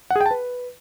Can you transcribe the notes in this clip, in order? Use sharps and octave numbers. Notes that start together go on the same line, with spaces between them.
F#5
G#4
G5
A5
B4